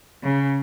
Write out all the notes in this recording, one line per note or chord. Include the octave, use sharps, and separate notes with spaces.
C#3